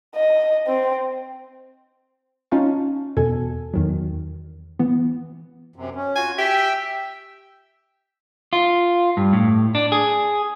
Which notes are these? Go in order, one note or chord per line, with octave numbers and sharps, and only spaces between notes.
D#5
C4
C#4 D#4 F4 F5 A5 C#6
E2 B2 A4 G#5
E2 D#3 F#3
E3 B3
F#2 C3
C#4
F4 F#4 G#5
G4 E5 G5 E6
F4
G2
A2
D4
G#4